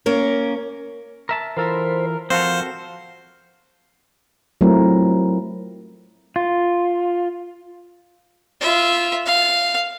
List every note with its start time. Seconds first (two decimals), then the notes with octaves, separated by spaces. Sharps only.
0.06 A#3 C#4 A#4
1.29 A#4 E5 A5
1.57 E3 F4 A4 A#4 C5 B5 C6
2.30 F3 C4 F#4 A4 C5 F5
4.61 F#3 A3 C4 E4 F4 A#4
6.36 F4
8.61 F4 E5
9.26 F5